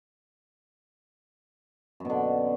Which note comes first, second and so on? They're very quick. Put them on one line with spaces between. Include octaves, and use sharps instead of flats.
F#2 B2 D3